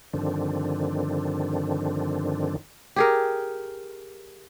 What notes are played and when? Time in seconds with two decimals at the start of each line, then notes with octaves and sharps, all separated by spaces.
0.13 G2 D3 D#3 F3 C4 D4
2.96 G4 G#4 A#4